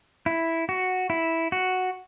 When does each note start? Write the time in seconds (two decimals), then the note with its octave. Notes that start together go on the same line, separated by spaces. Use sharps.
0.26 E4
0.69 F#4
1.10 E4
1.52 F#4